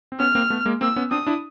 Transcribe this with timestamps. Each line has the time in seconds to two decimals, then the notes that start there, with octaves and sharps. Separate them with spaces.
0.12 C4
0.19 B3 C#4 F6
0.35 A#3 C4
0.50 A3 B3
0.66 G#3 A#3
0.81 A#3 C4 E6
0.96 B3 C#4
1.11 C4 D4 D#6
1.27 D4 E4